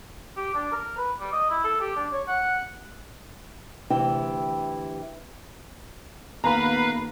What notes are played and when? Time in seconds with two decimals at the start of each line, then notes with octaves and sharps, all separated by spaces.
0.36 G4
0.54 D4
0.72 A#4
0.97 B4
1.20 G3
1.32 D#5
1.50 E4
1.64 A4
1.80 G4
1.96 D4
2.13 C#5
2.28 F#5
3.90 D2 C3 E3 E4 G4 G5
6.44 D#1 D#3 A#3 B3 B4 F5 A#5 B5